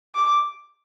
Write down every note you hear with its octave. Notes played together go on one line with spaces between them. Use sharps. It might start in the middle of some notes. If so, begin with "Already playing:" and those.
D6